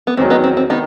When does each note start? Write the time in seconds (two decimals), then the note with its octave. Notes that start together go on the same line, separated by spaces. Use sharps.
0.07 B3
0.17 E2 D#3 F#3 C4
0.30 B3 D#4
0.44 C4
0.57 C4
0.70 D#3 B3 D#4